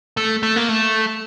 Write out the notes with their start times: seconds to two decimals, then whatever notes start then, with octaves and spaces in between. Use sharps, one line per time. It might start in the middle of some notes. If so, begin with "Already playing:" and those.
0.17 A3
0.43 A3
0.56 A#3
0.69 A3